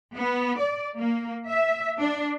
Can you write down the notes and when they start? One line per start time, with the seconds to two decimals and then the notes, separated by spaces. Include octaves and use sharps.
0.16 B3
0.60 D5
0.97 A#3
1.48 E5
1.99 D4